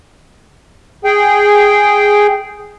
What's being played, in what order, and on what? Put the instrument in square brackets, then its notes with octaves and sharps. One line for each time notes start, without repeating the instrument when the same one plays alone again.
[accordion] G#4 G5